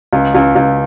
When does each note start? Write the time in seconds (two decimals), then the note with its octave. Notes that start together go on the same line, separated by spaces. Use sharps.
0.13 C#2
0.35 C#2
0.55 C#2